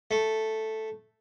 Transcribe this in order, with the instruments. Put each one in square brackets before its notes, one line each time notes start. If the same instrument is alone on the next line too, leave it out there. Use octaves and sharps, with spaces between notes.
[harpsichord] A3